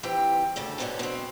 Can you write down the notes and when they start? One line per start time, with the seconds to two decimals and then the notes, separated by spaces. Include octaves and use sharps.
0.03 D#2 E3 C4 G4 G5
0.56 D2 G2 C#3 A4
0.79 G#2 B2 C#4 D4
0.99 B2 C4